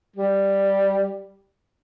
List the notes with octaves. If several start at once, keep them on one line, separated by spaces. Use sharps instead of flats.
G3